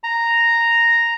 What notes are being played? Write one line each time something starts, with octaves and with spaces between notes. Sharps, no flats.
A#5